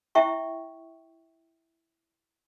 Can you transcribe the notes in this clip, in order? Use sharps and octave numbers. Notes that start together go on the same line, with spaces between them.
E4 E5 G5 C#6